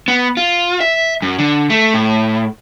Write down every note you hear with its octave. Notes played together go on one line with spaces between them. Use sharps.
B3
F4
E5
F#2
D3
A3
A2